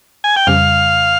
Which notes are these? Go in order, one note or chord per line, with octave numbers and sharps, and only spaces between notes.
G#5
G5
F2 C#3 G3 F5